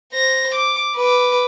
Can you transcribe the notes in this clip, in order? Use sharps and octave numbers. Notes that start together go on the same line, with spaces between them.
C5 A#6
D6
B4 D6